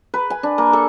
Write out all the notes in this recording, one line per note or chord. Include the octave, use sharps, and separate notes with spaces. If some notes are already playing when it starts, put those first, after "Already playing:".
B4
G#5
D4
A#3
A4